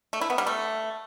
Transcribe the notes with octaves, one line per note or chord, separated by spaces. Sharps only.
A3
E4
B3
G3
A3